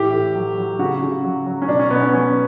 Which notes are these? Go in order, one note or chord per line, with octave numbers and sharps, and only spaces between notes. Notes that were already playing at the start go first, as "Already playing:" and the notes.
Already playing: A2 E3 G4
A2
F#3
F#3
C#3 F#4
C#3
F#3
F#3
C#4
B2 D4
C#4
B2 B3
C#4
F#3 C#4